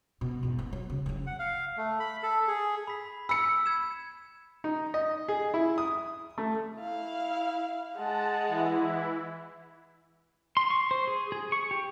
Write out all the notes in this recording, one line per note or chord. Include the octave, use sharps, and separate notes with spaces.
B2
E2 G#2
B3
F#3
C#3
F#1 F#3
F#5
F5
A3
B5
A4
G#4
B5 B6
B5 E6 C#7
G#6 E7
D#4
D#5
G#4
E4
D#6
A3
E4 F5
G#3 F#5 A5
E3 E4
C6
C#6
C5
G#4
G#4
C#6
G4